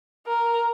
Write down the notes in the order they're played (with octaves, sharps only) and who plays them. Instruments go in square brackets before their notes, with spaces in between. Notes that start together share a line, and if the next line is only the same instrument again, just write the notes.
[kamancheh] A#4